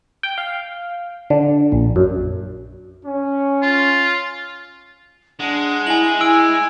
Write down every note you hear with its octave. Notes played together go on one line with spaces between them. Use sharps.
G5
F5
D3
A#1
F#2
C#4
F4
G#3 D4 F#5
E4 G#5 F#7
E4 G#5 E6 D7